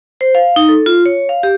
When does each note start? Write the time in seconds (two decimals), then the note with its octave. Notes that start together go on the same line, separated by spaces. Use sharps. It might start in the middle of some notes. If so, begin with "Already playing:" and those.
0.21 C5
0.35 F5
0.56 D#4
0.69 A4
0.86 F4
1.06 C#5
1.29 F5
1.43 G4